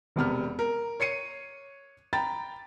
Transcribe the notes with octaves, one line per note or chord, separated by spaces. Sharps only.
E1 C3 B3 F6
A#4
C#5 C7 C#7 D#7
G5 A#5 B5 A6